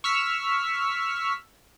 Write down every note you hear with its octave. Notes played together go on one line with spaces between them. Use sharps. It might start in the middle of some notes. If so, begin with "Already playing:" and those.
C#6 E6 F6 B6